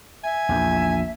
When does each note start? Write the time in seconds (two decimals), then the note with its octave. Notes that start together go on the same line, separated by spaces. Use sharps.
0.23 E5 G#5
0.49 A#1 E2